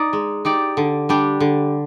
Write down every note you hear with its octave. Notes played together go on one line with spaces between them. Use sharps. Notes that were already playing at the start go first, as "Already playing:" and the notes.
Already playing: D#4 D5
G#3
D#4 G4 D5
D3
G3 D4 G4
D3